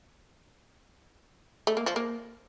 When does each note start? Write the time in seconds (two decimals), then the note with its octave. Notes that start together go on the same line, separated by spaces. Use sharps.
1.67 A3
1.77 A#3
1.86 F3
1.96 A#3